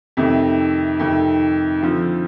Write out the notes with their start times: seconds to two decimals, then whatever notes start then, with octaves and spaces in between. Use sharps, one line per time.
0.17 F2 C3 D#3 A3
0.99 F2 C3 D#3 A3
1.82 D3 F3 C4 F4 A4